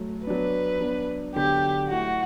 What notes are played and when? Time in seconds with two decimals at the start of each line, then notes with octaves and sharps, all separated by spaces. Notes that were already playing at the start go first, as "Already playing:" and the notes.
Already playing: F#3 A3
0.27 F#3 B3 D4 B4
0.80 F#3 B3 D4
1.35 D3 F#3 B3 D4 G4
1.89 F#3 A3 E4 F#4